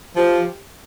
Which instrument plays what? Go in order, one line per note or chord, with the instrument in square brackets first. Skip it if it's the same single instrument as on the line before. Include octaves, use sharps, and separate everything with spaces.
[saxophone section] F3 G4